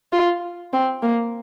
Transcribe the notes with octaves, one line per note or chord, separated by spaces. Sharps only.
F4
C4
A#3